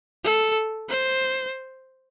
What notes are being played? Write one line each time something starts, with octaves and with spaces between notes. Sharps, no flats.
A4
C5